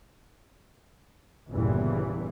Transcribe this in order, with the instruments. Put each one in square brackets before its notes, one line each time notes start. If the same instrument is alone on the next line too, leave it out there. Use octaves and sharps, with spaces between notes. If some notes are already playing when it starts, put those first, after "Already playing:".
[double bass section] G1 E2 A#2 C#3 E3 G3